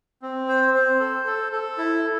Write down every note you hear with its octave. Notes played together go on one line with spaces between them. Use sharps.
C4
C5
C5
A4
A4
A4
E4